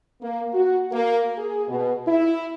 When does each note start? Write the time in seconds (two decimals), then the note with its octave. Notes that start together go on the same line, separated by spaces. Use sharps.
0.22 A#3
0.54 F#4
0.92 A#3
1.38 G#4
1.68 B2
2.08 E4